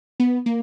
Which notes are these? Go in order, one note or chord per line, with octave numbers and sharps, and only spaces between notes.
B3
A#3